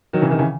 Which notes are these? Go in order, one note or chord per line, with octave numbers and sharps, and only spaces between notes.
D#3 F#3
C#3 E3
C3 D#3
C#3 E3